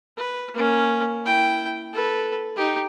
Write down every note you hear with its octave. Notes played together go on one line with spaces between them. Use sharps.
B4
A#3 C#4
E4 G5
A4 B4
D#4 G4